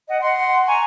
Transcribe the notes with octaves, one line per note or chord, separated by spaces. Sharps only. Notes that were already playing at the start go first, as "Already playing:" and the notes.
D#5 F#5
F#5 C6
G#5 A#5 C#6